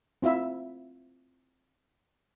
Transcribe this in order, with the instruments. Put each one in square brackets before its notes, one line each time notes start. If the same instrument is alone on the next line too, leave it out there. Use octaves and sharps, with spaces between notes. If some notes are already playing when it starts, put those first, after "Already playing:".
[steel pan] C4 E4 F4 E5